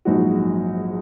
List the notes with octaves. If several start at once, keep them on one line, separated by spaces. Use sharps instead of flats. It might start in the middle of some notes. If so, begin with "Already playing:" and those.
A#1 G#2 F#3 D#4 F#4